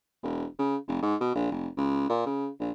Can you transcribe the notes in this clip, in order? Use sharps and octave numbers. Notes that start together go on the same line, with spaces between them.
E1
C#3
F1
G#2
B2
A#1
F1
C#2
A#2
C#3
A#1